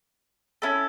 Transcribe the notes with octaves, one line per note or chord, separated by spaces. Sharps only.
C#4 E4 A4